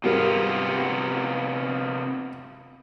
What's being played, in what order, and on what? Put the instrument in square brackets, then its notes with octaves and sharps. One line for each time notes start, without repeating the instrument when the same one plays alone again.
[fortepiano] G#1 G3 A#4 [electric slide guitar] C3 B3 F4